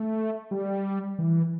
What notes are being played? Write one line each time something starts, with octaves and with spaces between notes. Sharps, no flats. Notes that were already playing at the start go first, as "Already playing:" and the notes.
Already playing: A3
G3
E3